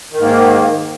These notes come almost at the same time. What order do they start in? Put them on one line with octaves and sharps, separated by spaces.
D#3 G#2 A#3